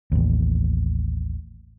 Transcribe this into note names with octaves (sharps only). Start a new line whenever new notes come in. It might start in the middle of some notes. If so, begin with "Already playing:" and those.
A1 D#2